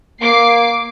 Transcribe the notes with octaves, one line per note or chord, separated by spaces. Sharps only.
A#3 D6 C7 D7